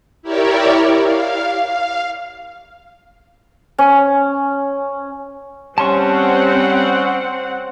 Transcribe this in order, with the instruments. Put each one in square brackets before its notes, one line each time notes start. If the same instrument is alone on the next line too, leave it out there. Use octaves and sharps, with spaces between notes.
[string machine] E4 G4 A#4 C#5 D5 E5
F5
F5
[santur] C#4
[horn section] G3 C#4 [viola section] C4 F#5 [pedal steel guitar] A5 C6 C#6